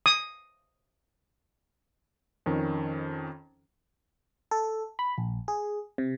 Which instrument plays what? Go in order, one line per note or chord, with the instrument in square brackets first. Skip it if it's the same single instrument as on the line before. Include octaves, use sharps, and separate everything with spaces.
[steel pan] D#6
[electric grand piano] F2 D#3 C#4
[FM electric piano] A4
B5
A#1
G#4
C3